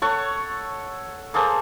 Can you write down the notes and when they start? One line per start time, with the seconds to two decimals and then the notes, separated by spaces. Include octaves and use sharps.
0.02 A4 C#5 F#5 C#6
1.34 A#3 G#4 A4 C5